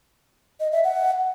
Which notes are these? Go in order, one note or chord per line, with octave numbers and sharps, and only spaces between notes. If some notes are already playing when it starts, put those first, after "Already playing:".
D#5
E5
F#5